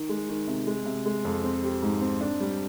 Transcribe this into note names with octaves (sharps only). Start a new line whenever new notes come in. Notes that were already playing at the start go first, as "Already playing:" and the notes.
Already playing: D#3
G#3
D#3
C3
G#3
C3
G#3
F2
C4
G4
G#2
C4
D4
G3